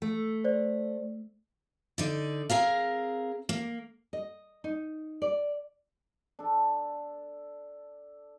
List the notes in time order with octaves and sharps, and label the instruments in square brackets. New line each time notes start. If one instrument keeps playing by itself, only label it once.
[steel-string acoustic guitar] A3
[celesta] C5 D5
[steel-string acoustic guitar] D3 D#4 D5
C4 G#4 A#4 F5
A#3
[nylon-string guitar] D#5
D#4
D5
[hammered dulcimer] D4 A4